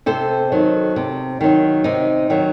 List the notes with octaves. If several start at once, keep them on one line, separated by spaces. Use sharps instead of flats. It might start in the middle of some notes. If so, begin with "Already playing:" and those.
C3 A4 C5
D#3 F#3
C3
D#3 F#3
C3 D#4
D#3 F#3